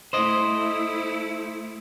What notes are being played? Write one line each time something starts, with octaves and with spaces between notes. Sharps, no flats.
A3 E4 C5 D#5